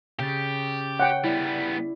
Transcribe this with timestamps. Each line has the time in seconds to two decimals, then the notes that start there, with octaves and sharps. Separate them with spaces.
0.19 C#3 G4 G6 A6
1.00 C#5 F#5 G5
1.24 G3 B3 E4 D5